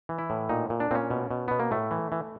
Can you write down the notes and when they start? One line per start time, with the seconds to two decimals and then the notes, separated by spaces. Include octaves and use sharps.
0.09 E3
0.19 E4
0.30 A2
0.49 A#2 D#4
0.70 A#2
0.80 D4
0.91 A#2 C4
0.95 C#4
1.10 B2
1.31 B2
1.48 B2 B3
1.60 A#3
1.71 A2 A3
1.91 E3
2.12 E3